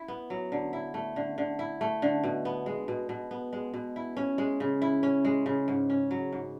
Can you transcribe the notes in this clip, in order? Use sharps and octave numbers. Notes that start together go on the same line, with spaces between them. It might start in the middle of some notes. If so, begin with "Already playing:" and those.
Already playing: E4
B3
F#3
D3
E4
A3
D3
D3
E4
A3
D3
B2
B3
G#3
B2
B2
B3
G#3
B2
E4
C#4
G#3
C#3
E4
C#4
G#3
C#3
G#2
C#4
F#3
G#2